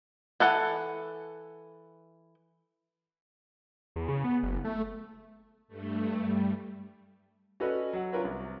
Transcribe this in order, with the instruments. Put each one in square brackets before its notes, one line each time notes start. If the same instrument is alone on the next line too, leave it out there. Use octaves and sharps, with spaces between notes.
[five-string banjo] E3 A4 F#5
[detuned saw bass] E2
C#3
B3
F#1
A3
[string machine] G2 A3
G3
[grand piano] C#4 F#4 A4 B4 D5 D#5
F#3 F#5
C#4 D4 F4 A#4 B4 C#5
C2